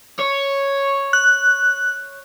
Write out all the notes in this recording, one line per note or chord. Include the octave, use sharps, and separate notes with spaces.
C#5
F#6